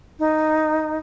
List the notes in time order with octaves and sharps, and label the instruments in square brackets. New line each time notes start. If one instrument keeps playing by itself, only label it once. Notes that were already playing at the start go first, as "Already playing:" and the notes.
[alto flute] D#4